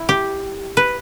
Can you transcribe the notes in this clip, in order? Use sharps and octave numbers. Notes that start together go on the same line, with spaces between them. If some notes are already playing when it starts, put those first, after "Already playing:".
Already playing: E4
G4
B4